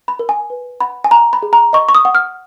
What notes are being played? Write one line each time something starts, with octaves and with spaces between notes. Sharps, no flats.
B5
A#4
G#5
B4
F#5 B5
G#5
F#5 A#5
B5
G#4
A#5
D#5 C#6
C#6
D#6
F#5
F6